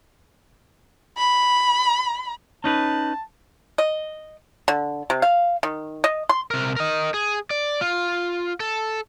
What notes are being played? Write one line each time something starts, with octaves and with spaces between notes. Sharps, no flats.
B5
C#4 D#4 B4 A5
D#5
D3
C3
F5
D#3
D#5
C6
C3 A#4
A#4 D#5
G#4
D5
F4
A4